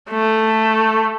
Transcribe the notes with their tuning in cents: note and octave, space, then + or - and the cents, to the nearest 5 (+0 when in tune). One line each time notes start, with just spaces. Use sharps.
A3 +5